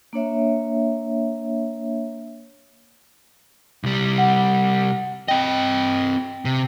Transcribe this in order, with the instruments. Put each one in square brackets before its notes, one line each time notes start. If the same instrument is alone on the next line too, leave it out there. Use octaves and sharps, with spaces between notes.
[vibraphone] A#3 D4 C#5 E5
[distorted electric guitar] C2 G3
[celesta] F#5
[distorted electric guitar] C4 D#5 [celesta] G5
[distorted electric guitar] C3